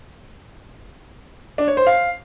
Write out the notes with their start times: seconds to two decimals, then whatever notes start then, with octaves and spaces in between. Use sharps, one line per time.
1.58 D4
1.68 C#5
1.77 C5
1.87 F5